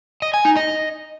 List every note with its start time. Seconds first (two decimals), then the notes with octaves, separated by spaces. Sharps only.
0.22 D#5
0.34 G#5
0.45 D#4
0.56 D#5